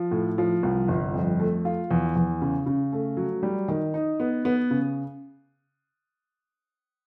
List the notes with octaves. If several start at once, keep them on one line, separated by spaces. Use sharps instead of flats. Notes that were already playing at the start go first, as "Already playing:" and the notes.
Already playing: F3
A2
F3
C2
G1
F2
A3
F4
E2
E2
C#3
C#3
A3
F#3
G3
D#3
D#4
B3
B3
C#3